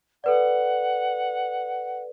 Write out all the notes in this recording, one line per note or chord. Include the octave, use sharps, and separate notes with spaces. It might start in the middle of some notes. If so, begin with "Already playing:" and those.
A4 B4 D5 F#5